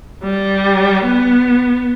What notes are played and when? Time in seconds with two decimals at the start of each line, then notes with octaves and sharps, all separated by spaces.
0.24 G3
1.06 B3